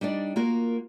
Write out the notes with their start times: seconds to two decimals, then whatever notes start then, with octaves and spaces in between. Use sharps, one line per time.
0.01 G3 D4 D#4 D5
0.36 A#3 F4 F#4 A#4